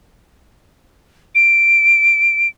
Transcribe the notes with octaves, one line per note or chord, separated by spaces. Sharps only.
D7